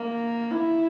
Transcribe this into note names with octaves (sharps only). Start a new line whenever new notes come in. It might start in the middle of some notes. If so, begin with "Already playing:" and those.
Already playing: A#3
E4